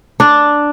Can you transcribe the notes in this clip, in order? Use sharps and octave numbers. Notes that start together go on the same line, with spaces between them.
D4